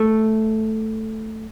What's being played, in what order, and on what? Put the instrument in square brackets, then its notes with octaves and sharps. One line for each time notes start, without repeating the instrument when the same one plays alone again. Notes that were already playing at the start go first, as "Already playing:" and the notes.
Already playing: [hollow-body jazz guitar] A3